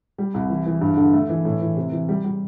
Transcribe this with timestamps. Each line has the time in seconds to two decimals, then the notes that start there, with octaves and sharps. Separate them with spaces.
0.18 G3
0.34 C2
0.50 E3
0.66 E3
0.81 G2
0.97 D3
1.13 A3
1.29 E3
1.45 A2
1.62 E3
1.77 C3
1.92 E3
2.09 G3
2.24 G3